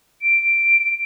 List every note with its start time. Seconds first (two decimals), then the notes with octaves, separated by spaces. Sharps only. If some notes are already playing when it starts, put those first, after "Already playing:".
0.22 D7